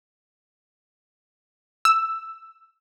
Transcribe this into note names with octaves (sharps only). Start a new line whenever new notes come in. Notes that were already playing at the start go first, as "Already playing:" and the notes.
E6